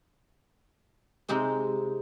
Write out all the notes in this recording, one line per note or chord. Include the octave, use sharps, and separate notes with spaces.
C3 G#3 D#4 G4 C5